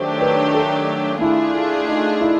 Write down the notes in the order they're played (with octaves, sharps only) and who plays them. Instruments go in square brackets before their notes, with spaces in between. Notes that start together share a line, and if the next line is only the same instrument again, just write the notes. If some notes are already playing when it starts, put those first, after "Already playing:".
Already playing: [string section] D#3 F#3 A3 D4 G4 [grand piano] C5
[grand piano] B4
A4
[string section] A3 D4 F4 G#4 [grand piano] E4
[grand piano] D#4
E4